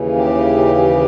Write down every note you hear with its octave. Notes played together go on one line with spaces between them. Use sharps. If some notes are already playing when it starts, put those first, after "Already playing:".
Already playing: D#2 C#3 E3
G4